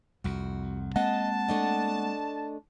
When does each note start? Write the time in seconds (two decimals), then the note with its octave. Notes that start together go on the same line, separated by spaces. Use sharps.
0.24 C2 F2 F#4
0.96 G#3 A#3 C4 D#5 F#5 A5
1.48 A3 D4 D#5